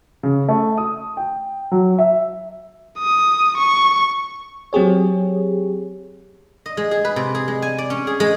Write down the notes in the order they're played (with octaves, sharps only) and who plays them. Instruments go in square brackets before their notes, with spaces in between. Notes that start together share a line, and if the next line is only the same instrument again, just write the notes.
[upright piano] C#3
A3
D#6
G5
F#3
E5
[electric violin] D#6
C#6
[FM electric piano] F#3 C4 G4 G#4 C#5
[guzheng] D#5
G#3
G#4
B4
C3
G#4
G#3
G#5
D5
C#4
G#4
G#3